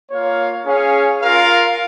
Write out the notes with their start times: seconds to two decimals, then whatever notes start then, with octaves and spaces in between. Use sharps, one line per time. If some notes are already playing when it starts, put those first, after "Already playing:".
0.09 A#3 F4 C#5 F5
0.64 C#4 G#4 C#5 F5
1.19 F4 A#4 F5